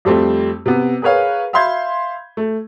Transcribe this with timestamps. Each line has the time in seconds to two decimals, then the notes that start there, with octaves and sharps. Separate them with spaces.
0.05 F2 G3 A3 C4
0.66 C3 B3
1.02 G#4 A#4 B4 C#5 F5
1.53 E5 F5 B5 C6 G6 G#6
2.37 A3